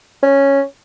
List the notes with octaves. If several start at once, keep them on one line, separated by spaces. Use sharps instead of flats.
C#4